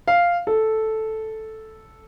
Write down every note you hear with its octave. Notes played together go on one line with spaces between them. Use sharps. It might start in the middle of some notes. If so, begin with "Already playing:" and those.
F5
A4